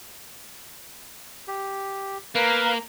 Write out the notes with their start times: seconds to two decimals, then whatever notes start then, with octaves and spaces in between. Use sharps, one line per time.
1.48 G4
2.35 A#3 A#4 B4 F5